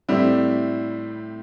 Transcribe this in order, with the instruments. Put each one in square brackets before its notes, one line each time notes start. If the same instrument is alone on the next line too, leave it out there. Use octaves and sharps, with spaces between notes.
[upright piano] A2 G3 C4 E4